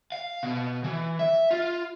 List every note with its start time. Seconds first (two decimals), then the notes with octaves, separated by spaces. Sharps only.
0.12 F5
0.43 B2
0.84 E3
1.19 E5
1.51 F4